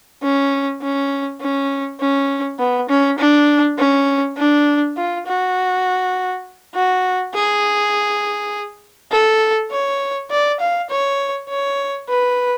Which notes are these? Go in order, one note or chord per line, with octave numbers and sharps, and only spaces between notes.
C#4
C#4
C#4
C#4
B3
C#4
D4
C#4
D4
F4
F#4
F#4
G#4
A4
C#5
D5
F5
C#5
C#5
B4